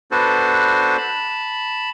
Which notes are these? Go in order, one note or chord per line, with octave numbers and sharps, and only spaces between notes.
B3 D4 F#4 A4 B4 C5
A5 B5